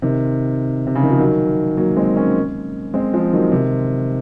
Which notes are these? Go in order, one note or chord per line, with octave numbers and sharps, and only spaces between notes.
C3 D#3
C3
C#3
D#3
F3
D#3 F#3
F#3 A#3
G#3 C4
A#3 C#4
G#3 C4
F3 G#3
D#3 F#3
C3 D#3